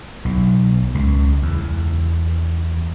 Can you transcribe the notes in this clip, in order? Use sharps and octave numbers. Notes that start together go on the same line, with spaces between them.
B1
C#2
E2